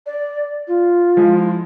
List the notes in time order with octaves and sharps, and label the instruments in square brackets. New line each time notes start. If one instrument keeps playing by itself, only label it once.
[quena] D5
F4
[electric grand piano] F3 G#3 E4